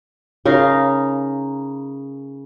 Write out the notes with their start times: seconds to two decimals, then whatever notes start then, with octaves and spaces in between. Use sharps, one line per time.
0.45 C#3 D#4 A#4 F5